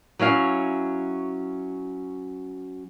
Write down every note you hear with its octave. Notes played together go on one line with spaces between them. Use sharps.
F#3 C#4 E4 F5